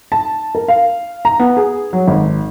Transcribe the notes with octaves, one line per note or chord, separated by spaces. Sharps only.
A5
A#4
F5
A#5
B3
G#4
F#3
G#1